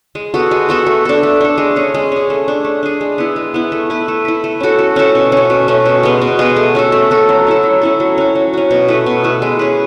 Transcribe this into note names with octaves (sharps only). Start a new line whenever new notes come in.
G#3
B3 F#4 A4
G#3
B3 F#4 A4
A3
D4 A4
A3
D4 A4
G#3
C#4 G#4
G#3
C#4 G#4
A3
D4 G#4
A3
D4 G#4
G#3
B3 E4
G#3
B3 E4
A3
E4 B4
A3
E4 B4
A3
C#4 F#4 A4
A3
C#4 F#4 A4
B2
A3 C#4
B2
A3 C#4
B2
G#3 B3
B2
G#3 B3
A3
C#4 F#4 A4
A3
C#4 F#4 A4
F#3
C#4 E4 A4
F#3
C#4 E4 A4
F#3
C#4 F#4
F#3
C#4 F#4
B2
A3 E4 B4
B2
A3 E4 B4
G#3
C#4 G#4 B4